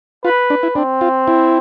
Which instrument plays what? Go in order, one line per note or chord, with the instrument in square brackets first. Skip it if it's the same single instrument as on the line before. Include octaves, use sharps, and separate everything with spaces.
[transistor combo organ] F4 [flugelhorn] B4
[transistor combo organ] D4
E4
[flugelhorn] C4 [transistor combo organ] D4
[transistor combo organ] F4
E4